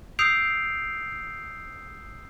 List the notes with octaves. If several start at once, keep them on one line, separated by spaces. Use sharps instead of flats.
D#6 E6 G6 C7 D7 F7